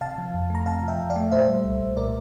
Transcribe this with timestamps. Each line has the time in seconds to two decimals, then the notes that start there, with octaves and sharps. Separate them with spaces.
0.01 C3 F5 A5
0.18 F3
0.34 F2
0.50 A3 A#5
0.66 C3 F5 A5
0.83 F3
0.88 E5 G5
0.99 F2
1.10 D5 F5
1.16 A3
1.32 A#2 C5 E5
1.48 G3
1.64 C2
1.81 C2
1.96 A#2 A#4 D5